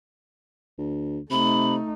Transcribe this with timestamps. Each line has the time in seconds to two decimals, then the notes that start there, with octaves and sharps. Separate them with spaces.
0.78 D2
1.31 C3 A3 D#4 B5